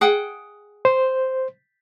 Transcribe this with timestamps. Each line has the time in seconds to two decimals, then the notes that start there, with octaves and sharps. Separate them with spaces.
0.01 G#4 F#5 G5
0.85 C5